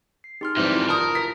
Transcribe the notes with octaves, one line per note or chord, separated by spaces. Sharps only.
C7
D#4 G4 G#4 C6 F6
F2 G#2 E3 G3 C5 E5
E4 F4
A#4 A5 D#6 F6
B6